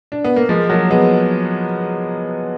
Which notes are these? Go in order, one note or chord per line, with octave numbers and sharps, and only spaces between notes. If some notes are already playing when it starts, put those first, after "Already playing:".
D4
B3
A#3
F3 G#3
F#3 A#3
G#3 B3